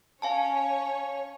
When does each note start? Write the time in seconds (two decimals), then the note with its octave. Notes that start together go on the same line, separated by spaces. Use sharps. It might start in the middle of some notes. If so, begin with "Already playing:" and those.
0.22 C#4 C#5 F5 G#5 A5